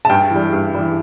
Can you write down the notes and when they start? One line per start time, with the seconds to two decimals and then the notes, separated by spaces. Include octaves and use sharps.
0.05 A5
0.10 G2 G5
0.31 E3 G3
0.53 G2
0.75 E3 G3